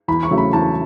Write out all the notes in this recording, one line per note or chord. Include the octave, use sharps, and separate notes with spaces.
E2 B5
C#6
C#3 F#3 A3
B5
E2 A5